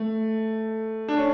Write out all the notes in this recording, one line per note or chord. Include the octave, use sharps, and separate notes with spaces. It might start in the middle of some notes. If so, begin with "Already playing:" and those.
Already playing: A3
D4
C#4